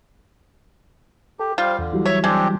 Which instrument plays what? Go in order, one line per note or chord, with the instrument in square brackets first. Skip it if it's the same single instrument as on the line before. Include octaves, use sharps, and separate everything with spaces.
[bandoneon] G4 [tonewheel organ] A4
[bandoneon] G3 F5 [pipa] F4 [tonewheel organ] C5 G5
[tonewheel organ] E2 [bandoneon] D3
[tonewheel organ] E3 F#3 G3
[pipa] C#5 [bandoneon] E5
[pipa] G#3 [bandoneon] C4 D4 G4